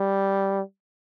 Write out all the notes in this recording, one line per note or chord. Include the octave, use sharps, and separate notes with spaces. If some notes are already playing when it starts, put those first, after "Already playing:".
Already playing: G3